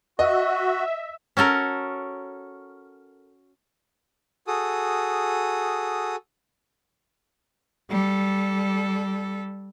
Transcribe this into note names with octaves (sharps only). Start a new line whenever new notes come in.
F#4 D#5 E5
C#4 F#4 A4 A#4
F#4 G#4 A4 D#6
G3 A4